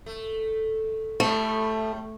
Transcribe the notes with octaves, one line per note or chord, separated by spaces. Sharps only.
A3
A2 G3 A3